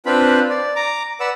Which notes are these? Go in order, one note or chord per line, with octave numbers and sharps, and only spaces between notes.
C4 D4 F4 B4 B5
D5
A#5 D6
B4 D5 F#5 E6